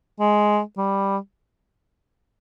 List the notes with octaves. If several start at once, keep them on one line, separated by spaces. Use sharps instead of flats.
G#3
G3